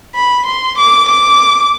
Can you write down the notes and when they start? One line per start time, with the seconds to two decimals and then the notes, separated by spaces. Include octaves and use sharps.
0.16 B5
0.46 C6
0.78 D6
1.08 D6